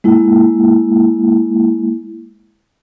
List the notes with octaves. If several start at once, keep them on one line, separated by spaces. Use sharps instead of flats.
G#3 A#3 E4